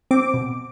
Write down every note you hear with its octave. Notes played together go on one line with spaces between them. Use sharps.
C4 D6
B2